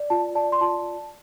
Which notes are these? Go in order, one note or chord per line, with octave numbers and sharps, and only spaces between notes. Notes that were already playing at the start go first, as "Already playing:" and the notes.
Already playing: D5
F4 A5
D5 A5
C6
F4 A5